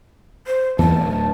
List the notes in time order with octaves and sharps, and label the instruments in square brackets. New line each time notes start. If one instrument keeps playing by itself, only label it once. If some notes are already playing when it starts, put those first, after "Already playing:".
[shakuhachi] C5
[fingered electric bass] E2 E3 A#3 [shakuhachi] A5
[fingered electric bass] D1